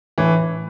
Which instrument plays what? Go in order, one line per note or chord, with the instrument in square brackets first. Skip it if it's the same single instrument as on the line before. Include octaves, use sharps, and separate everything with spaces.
[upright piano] A2 [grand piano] E3